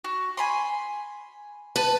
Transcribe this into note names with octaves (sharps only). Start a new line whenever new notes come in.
F#4
G#5 B5 C6
B4 A5